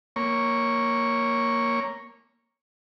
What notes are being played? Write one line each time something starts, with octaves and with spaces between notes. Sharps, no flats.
A#3 C#5